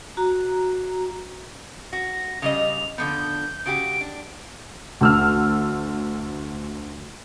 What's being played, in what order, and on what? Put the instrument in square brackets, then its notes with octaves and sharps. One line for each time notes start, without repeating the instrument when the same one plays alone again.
[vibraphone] F#4 A#5
[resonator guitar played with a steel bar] F#4 [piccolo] A#6
[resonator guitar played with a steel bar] C#3 G3 D#5 [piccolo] F7
[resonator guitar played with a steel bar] D3 F3 B3 [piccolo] G6
[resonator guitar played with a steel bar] C#3 F#4 G4 [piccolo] D7
[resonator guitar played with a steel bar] D4
[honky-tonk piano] D2 E6 F6